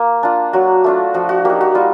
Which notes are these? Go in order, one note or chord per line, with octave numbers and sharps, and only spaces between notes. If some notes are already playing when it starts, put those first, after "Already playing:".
Already playing: A#3
D4 F4
F#3 F#4
A3 D4 F4
F3 F#4
F#4
A#3 D#4 G4
F#4
G3 F4